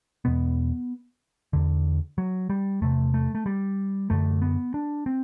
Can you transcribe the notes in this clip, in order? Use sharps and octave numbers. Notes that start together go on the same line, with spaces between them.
E2 B2 B3
E2 D3
F#3
G3
E2 C3 A3
A3
A3
G3
F#2 D3 A3
B3
D4
C4